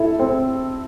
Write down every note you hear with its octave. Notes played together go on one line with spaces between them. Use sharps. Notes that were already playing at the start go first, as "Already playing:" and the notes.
Already playing: E4 A4
C4